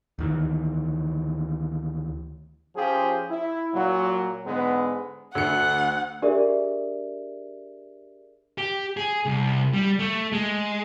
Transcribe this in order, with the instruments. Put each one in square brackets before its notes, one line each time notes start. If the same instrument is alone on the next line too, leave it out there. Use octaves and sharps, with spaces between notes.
[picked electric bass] D2 D#3 E3
[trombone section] F3 C#4 F4 G4 G#4
E4
A#2 F#3
G#2 D3 G#3 B3
[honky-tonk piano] D2 A3 C#7 [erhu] F#5
[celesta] D4 G4 G#4 A#4 D5 E5
[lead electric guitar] G4
G#4
C2
G3
A3
G#3